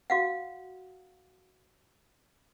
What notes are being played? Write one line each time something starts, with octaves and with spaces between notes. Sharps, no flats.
F#4 F5 F#5